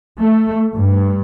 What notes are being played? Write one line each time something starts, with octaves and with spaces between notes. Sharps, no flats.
A3
G2